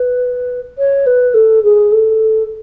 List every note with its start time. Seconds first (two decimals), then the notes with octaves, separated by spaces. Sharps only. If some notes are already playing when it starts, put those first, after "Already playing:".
Already playing: B4
0.78 C#5
1.06 B4
1.34 A4
1.64 G#4
1.92 A4